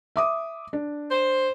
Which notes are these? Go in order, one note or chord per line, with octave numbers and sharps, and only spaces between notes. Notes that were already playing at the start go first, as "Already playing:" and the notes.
E5 D6 D#6
D4
C5